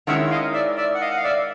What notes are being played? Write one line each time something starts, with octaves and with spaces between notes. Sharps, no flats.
D#3 G#3 C#4 E4 E5 F#5
D#5 F5
D5 E5
D5 E5
F#5
D#5 F5
F#5
F5
D5 E5